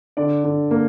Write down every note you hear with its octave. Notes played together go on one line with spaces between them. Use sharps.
D3 D5
D3
A#3